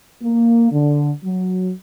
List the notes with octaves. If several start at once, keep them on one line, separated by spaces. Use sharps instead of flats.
A#3
D3
F#3